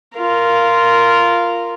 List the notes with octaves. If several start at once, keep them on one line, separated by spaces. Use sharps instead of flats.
F4 A#4